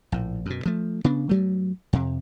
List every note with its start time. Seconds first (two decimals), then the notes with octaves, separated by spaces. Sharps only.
0.12 A#1 A2
0.46 F#2 B2
0.66 F3 A3
1.04 C#3 B3 D4
1.29 G2 F#3 A3
1.93 F2 C3